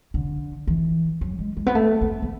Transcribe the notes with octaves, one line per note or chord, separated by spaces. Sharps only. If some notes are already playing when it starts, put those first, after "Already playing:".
D3
E3
F#3
G#3
G#3
B3
A3
B3
B3